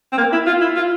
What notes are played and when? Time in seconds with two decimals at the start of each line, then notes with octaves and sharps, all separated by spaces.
0.12 C4
0.18 A#3
0.32 E4
0.47 F4
0.61 E4
0.76 F4